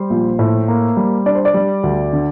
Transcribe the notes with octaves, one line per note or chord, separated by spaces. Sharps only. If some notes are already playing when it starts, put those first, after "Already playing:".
Already playing: G3 C5
A#1
A2
A#3
G3
D4 D5
C5
D5
G3
D2
D3